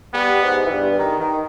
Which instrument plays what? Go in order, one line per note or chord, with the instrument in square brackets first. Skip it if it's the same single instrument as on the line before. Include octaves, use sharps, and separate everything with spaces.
[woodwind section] G3 G4 [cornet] B3
[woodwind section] G#2 G#3
E3
G2 G3
D#3
D#3